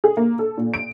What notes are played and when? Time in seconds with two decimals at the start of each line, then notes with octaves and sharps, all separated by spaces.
0.04 G#4
0.17 A#3
0.39 A4
0.57 A#2
0.74 D7